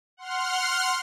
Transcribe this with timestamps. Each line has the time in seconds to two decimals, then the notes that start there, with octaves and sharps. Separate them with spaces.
0.17 F#5 C6 F6